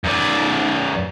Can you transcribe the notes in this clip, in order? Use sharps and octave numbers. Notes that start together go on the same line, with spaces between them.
F#2 D5